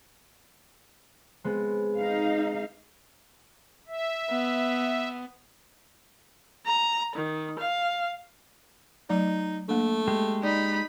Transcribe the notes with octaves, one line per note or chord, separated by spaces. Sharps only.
G#3 B3 C4
D#4 F5
E5
B3
A#5
D#3
F5
F#3 A3 D#4 D5
A3 A#3 D4
G#3 G4
D#4 D5 B5